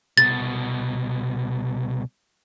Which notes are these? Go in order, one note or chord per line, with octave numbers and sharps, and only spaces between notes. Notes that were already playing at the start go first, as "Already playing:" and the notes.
C2 B2 A6